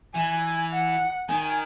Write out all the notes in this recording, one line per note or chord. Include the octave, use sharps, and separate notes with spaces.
E3 G#5
F#5
D#3 G#5